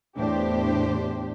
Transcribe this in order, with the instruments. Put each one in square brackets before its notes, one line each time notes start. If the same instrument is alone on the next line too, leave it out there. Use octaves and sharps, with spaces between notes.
[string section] E2 A2 D4 G4 C5